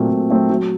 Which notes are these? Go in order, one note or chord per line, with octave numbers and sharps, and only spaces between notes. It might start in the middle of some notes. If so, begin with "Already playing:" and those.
Already playing: A#2 F#3 A3 C4
A#2
F#3 A3 C4
F#3